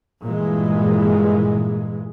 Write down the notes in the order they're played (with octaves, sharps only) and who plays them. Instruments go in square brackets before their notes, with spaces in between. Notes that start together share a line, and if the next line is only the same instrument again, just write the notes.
[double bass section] G2 A#2 E3 G#3